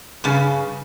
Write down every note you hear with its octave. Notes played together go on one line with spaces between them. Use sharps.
G2 C#3